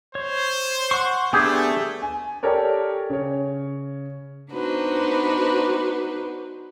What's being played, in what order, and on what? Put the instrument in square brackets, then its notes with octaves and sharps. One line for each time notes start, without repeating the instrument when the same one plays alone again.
[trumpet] C5 [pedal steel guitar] C#5
[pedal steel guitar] F#5 C6 C#6
[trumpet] A3 [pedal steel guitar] B3 D4 [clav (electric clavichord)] G4 G#4
[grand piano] G#5
G4 A4 A#4 C#5 D5
C#3 C#5
[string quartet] B3 D4 D#4 F#4 B4 C5